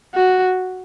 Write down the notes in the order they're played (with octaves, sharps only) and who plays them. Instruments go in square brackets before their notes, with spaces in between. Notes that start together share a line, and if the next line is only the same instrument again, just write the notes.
[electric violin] F#4